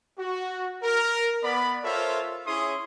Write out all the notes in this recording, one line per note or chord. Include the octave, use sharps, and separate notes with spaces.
F#4
A#4
B3 D5 B5
F4 A4 A#4 C5 C#5 E5
C#4 E4 G#4 C#5 C6 D#6